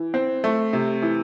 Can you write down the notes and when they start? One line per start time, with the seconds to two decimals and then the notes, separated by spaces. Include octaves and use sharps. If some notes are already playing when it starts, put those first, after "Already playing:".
Already playing: E3
0.14 C4
0.44 A3
0.73 C3
1.02 E3